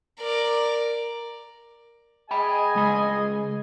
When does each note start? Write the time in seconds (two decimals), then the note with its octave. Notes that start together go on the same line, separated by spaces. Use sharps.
0.19 A#4 D5
2.31 G#4 D#5 G5 G#5 B5
2.75 C#2 G#3 B5